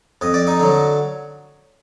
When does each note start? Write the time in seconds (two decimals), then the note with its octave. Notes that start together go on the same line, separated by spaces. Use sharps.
0.21 F2 D#5
0.34 D5
0.47 D#4 D#5
0.59 D3 F#3